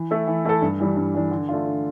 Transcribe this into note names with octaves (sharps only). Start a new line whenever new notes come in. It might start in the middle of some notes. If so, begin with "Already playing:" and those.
Already playing: E3
A3 E4 A4
E3
A3 E4 A4
G2
E3 G3 D4
G2
E3 G3 D4
D3
A3 D4 F4
D3